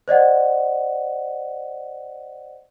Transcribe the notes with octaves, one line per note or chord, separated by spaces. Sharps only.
C5 D5 D#5 F#5